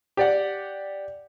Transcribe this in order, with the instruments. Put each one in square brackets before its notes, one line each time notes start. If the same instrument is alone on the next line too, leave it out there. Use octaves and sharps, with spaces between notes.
[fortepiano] G4 D5 F#5